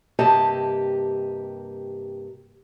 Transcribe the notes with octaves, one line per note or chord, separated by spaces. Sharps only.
G2 C3 A#3 G4 D#5 A5